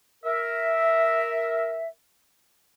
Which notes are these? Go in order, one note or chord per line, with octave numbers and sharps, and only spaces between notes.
A#4 E5